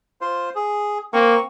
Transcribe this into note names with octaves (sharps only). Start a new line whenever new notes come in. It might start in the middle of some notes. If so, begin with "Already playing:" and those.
F4 C5
G#4
A#3 C4 C#6